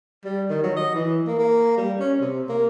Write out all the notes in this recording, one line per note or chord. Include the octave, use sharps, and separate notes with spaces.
G3
D#3
F#3
D#5
E3
A#3
A#3
G3
C#4
C3
A#3